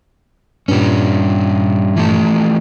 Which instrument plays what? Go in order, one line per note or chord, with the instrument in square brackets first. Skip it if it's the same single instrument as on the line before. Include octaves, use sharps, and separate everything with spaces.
[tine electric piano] G2 A#2 [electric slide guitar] G3 C#4
[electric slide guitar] E3 F3 A3